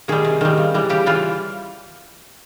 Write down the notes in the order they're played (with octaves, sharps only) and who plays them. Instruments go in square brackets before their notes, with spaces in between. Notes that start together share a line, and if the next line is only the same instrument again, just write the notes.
[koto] D#3 G3 G#4
C3
D#3 G3
C#3
E3 G3
C#3 G4
E3 G3 F4